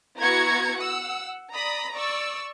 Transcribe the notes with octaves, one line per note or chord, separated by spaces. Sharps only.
B3 E4 F#4 A#5 G#6 C#7
F#5 E6
D5 A#5 B5 D#6
D5 C#6 E6